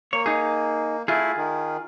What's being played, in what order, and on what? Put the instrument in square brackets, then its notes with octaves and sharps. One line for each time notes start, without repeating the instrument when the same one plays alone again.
[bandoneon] A#3 [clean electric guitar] C#5
[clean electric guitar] D#4 G#4
[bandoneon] A3 E4 [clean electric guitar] F4 G#4
[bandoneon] D#3